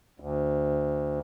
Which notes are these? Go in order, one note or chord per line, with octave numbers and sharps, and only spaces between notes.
D2